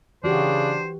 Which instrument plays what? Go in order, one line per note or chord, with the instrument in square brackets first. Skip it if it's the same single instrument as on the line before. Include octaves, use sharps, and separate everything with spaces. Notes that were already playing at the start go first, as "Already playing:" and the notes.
[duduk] C#3 [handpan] E3 F#4 G4 [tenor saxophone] D4 [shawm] C5